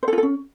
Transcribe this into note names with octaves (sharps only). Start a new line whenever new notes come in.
C5
A4
F4
A4
C#4